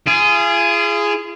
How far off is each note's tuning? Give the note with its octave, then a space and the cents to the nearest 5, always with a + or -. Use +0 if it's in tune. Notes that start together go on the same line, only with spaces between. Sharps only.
F4 -40 G#4 +0